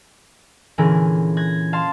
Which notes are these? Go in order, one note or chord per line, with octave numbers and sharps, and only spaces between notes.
A#2 D3 E3 C#4 G#4 A#4
F#6 G#6 A#6
F5 A5 C6